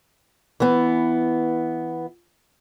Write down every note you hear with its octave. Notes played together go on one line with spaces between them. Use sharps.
E3 B3